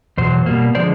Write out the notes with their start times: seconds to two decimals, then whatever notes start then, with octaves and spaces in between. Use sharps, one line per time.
0.18 E2 B2 F#3 C5
0.46 B2 G3 A#3
0.75 D3 F3 G#3 C5 D5